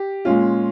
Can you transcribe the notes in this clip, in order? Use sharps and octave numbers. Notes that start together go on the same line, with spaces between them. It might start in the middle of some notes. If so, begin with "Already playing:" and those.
Already playing: G4
A#2 G#3 C#4 F4